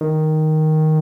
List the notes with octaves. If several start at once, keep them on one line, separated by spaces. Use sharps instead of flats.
D#3